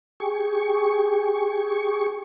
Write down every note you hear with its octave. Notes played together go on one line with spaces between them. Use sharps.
G4 G#4 C#6